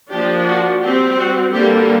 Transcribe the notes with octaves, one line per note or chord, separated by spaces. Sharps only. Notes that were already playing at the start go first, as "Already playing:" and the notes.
F3 A#3 D4 G4
F#4
G3 C4 G4
F#4
D3 G3 A#3 G4